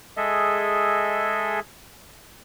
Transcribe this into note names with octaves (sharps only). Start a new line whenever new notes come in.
G#3 G#4 A4 D#5 E5